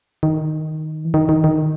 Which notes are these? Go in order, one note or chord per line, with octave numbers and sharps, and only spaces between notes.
D#3
E3
D#3
D#3
D#3